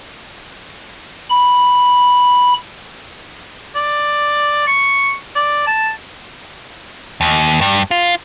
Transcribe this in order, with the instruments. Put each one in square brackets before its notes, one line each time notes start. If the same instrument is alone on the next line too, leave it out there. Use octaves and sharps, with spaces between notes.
[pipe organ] B5
[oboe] D5
C#6
D5
A5
[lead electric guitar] D#2
G2
F4